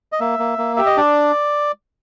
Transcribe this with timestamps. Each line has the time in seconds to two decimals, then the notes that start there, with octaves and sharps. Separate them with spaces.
0.12 D#5
0.20 A#3 E5
0.39 A#3
0.58 A#3
0.76 G4 E5
0.86 D#5
0.97 D4 D5